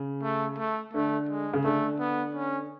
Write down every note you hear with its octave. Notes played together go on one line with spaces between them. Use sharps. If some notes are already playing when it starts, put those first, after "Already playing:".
Already playing: C#3
A3
A3
D3 A3
G#3
C#3
D3 A3
B3
C#4